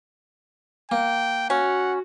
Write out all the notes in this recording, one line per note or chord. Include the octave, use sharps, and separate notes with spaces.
A#3 G5
C#4 F#4 F#5